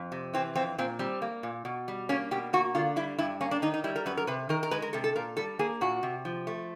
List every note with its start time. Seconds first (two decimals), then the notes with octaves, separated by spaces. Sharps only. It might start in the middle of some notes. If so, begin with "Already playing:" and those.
Already playing: F2
0.12 C3
0.34 E3 C4
0.55 F2 C4
0.78 A#2 C4
0.99 G3 C4
1.22 A#3
1.43 A#2
1.65 B2
1.88 G3
2.09 A#3 C#4
2.31 B2 G4
2.53 A#3 F#4
2.75 D3 F4
2.96 G3 E4
3.19 G2 E4
3.41 A#3 C#4
3.51 D4
3.62 D#3 D#4
3.74 D#4
3.84 G3 E4
3.96 A#4
4.06 F#2 B4
4.17 A#4
4.27 C3 B4
4.49 D#3 A#4
4.63 A#4
4.71 G#3 B4
4.82 A#4
4.93 C3 A4
5.04 A4
5.16 A#2 A#4
5.37 G3 A4
5.59 A#3 G#4
5.81 A#2 F#4
6.03 C3
6.25 F3
6.47 A3